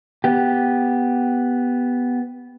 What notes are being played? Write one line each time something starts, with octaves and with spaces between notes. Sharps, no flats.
B3 G4